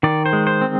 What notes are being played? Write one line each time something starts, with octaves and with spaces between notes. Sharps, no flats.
D#3 D5
C5
G#3
C5
C4